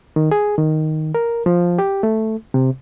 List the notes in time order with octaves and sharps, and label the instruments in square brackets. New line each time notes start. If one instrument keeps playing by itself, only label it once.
[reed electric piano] D#3
G#4
D#3
A#4
F3
G4
A3
C3